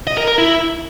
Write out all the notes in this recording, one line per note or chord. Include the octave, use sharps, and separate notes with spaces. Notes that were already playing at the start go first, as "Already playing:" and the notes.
D#5
A#4
A#4
E4